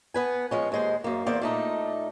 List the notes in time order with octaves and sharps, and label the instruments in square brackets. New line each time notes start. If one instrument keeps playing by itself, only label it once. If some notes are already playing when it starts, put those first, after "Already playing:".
[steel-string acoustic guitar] B3 B4 G#5
F3 G#3 C#4
D#2 G#3 C5
F#2 A#3
E2 A#3 C5 D5
A#2 A3 D#4